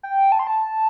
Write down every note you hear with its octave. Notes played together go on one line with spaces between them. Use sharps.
G5
A5
C6
A5